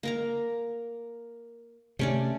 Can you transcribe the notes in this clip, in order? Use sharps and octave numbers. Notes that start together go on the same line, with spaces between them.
A#3 A#4 A#5
C3 A3 C#4 D5